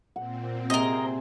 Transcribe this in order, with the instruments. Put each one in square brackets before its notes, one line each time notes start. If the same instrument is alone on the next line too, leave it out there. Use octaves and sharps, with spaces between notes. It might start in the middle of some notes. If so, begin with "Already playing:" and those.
[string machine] A#2 C4 [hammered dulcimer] F#5
[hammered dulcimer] C3 G#4 [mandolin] A#4 D#5